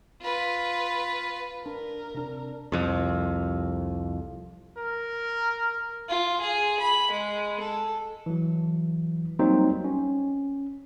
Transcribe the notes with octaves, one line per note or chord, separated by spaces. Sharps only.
F4 B4
D4 A#4
C3 D4
C2 F2
A#4
F4
G#4
B5
G#3
A4
E3 F#3
F#3 G3 A#3 C4 D#4 C5
C#4